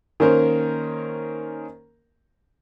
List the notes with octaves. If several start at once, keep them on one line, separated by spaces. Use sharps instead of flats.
D#3 A#3 C#4 A#4 C5